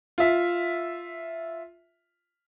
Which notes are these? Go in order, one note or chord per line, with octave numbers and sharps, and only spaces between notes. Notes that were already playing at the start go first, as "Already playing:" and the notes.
F4 E5